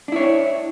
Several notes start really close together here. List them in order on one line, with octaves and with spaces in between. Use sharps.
D4 E4 C#5